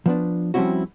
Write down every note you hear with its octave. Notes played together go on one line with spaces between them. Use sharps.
F3 B3 D4
F3 G3 C4 C#4 E4 F#4